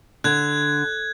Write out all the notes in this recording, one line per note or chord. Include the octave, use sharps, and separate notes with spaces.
D3 F#6 G#6